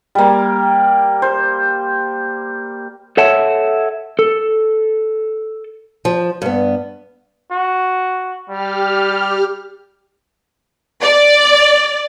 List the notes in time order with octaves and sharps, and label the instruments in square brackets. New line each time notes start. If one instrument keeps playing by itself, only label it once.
[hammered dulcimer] G3 A#3
C5
[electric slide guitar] A4 C#5 E5 F#5 A5
A4
[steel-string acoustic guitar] F3
G2 B3
[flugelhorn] F#4
[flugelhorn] G3 [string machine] G4 F6
[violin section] D5